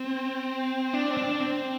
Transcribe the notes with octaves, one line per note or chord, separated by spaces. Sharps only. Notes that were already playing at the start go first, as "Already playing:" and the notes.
Already playing: C4
D4
C4
D4
C4